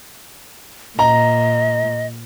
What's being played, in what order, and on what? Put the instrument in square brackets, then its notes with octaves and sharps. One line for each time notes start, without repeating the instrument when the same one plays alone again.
[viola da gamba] A#2 [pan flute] D#5 [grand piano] A#5